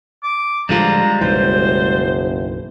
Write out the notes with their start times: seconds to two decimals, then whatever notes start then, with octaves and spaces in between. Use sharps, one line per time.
0.24 D6
0.69 A1 D3 F3 G3 G#3 F4 A#5
1.21 F#1 B1 F#2 E3 C5